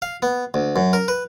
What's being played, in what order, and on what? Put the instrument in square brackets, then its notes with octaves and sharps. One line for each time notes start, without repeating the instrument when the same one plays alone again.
[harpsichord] F5
B3
D2
F#2
A#4
B4